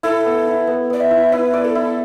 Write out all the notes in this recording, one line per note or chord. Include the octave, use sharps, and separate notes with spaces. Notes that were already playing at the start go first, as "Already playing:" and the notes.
E4 A4
B3
E4
B3
B3 D5
E5
E4
E4 B4
D5
A4
E4